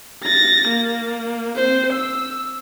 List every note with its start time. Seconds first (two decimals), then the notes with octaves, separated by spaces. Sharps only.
0.24 A6 A#6
0.68 A#3
1.56 C4 C5
1.93 E6